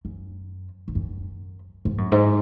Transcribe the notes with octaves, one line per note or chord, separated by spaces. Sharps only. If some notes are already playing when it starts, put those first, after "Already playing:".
F#2
E2
F#2
G#2
F#2
G#2